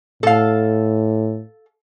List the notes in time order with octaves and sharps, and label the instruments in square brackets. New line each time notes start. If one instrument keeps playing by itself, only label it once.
[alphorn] A2 [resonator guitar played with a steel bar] A4 F5